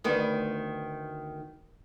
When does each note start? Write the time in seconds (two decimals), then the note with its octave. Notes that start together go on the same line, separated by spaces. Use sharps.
0.04 D2 D#3 B3